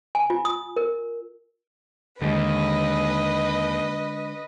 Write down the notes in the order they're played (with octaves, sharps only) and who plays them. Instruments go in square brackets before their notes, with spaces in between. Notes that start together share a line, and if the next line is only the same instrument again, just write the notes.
[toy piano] G#5
F4
D#6
A#4
[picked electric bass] D#2 [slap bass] D3 G#3 [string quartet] B4 D#5